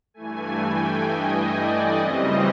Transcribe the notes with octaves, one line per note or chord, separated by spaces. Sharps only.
G2 E3 A3 G#5
G5
D#5
D5
F#2 C#3 E3 G3 C4 D#5